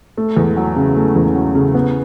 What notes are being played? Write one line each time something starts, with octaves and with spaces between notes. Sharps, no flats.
A3
E2
F#3
C#3
A3
E2
F#3
C#3
B3